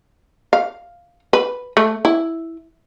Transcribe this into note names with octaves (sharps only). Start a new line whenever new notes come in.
F5
B4
A3
E4